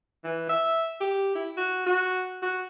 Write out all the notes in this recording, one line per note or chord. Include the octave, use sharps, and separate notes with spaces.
E3
E5
G4
E4
F#4
F#4
F#4